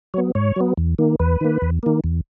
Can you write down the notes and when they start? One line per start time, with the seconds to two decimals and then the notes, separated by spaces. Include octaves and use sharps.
0.14 F#3 B3 C#5
0.35 G#2 C#5
0.56 F#3 B3
0.78 E2
0.99 D#3 A#3
1.19 E2 B4
1.41 D#3 A#3
1.62 E2
1.83 D#3 A#3
2.04 E2